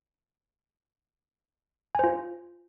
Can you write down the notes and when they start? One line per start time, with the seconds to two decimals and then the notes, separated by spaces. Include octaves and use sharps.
1.95 G#5
1.99 C5
2.04 F4